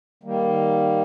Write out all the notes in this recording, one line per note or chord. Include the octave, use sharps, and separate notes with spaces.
D#3 G3 A#3